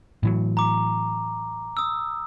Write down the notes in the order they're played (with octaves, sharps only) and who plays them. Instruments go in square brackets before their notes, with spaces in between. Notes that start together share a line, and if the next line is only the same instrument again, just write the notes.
[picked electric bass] A2 E3 F#3
[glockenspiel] A#5 D6
D#6 E6